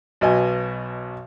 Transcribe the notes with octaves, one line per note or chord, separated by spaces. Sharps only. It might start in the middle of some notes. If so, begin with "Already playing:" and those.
B1 B2 D#5 G#5